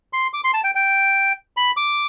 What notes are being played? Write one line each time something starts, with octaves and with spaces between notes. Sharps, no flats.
C6
D6
C6
A5
G5
G5
B5
D6